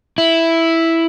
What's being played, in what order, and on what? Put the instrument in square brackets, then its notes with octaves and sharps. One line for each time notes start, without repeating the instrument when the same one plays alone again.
[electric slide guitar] E4